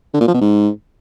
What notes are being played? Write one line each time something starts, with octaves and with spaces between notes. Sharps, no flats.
D3
A#2
F3
B2
G#2